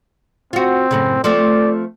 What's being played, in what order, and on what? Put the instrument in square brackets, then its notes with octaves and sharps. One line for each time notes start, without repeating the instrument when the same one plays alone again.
[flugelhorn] C4 [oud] F4 F#4
[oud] F#2 A2 C#3
[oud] F3 A3 C4 [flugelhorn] D5